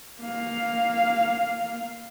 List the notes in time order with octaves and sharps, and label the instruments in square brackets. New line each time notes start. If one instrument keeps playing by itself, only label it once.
[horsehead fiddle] A#3 F5